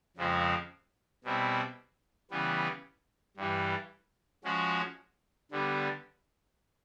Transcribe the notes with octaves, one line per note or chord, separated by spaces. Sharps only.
F2 C#3 F3 G#3 C4
B2 G3 C4 E4
C#3 E3 G3 B3
G2 E3 G3
F3 G#3 C#4 F#4
D3 G3 B3